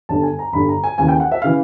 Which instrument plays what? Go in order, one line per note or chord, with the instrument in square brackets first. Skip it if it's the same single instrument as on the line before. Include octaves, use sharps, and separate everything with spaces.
[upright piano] G1 G2 D3 A5
G#5
A#5
G1 G2 D3 B5
A#5
G#5
D#2 C#3 E3 G#5
G5
F#5
E5
C#3 E3 F5